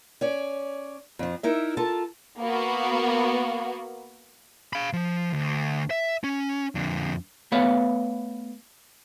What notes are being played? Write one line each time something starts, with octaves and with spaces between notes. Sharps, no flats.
C#4 C#5 D5
F2 F3
D#4 E4 A#4 E5
F4 A4 A#4 A5
A#3 B3 F#4
F5 B5
F3
D2
E5
C#4
F2 D3
A3 B3 B4 C#5 F5